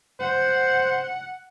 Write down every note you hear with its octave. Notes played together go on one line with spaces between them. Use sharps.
C5 F#5